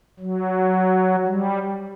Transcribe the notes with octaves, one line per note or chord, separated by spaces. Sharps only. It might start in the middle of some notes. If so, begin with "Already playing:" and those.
F#3
G3